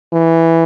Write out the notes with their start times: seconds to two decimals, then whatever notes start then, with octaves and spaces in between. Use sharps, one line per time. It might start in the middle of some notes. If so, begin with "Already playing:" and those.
0.13 E3